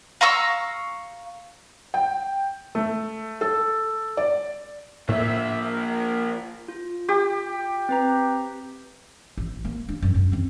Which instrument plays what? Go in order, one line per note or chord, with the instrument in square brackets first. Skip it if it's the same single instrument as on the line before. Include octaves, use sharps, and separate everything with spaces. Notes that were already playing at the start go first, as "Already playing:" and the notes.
[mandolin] F5 A#5 C#6 E6
[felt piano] G5
A3
A4
D5
[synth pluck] A2 [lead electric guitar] F3 A#3 [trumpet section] E5
[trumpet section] A#4
[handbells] F4
[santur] G4
[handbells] C4 B4 A#5
[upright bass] A1
A#3
D4
F#2
F#2
D#3 C4